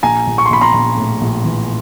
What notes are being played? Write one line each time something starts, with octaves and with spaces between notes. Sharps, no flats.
A#1 G#5 A#5
A#1
C#6
C6
A#1 B5
A#5 C6
A#1
A2
A#1
E3